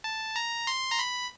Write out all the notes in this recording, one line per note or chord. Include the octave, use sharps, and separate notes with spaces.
A5
A#5
C6
A#5
B5